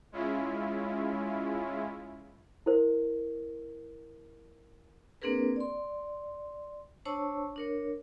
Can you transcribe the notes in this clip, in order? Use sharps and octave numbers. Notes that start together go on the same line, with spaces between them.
G#3 C#4 E4 F4
E4 A#4 C5
A#3 C4 D4 G#4 A#4 B4
D5 C6
D4 C5 C#5 A5 C#6 E6
D4 A#4 C#5